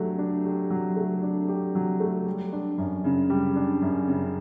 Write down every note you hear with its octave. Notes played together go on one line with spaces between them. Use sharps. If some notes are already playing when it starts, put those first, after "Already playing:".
Already playing: F#3 A3 D4 G4
D4
G4
F#3
A3
D4
G4
F#3
A3
G3
D4
F#2
C#3
G3
D4
F#2
C#3